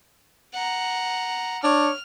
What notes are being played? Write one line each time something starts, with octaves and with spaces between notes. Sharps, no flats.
F#5 A#5
D4 C#5 F6